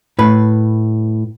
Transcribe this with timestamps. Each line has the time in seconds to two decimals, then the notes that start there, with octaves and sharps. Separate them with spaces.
0.19 A2 B4